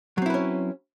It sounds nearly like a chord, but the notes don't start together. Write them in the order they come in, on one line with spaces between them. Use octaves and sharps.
F#3 C4 E4 B4 C#4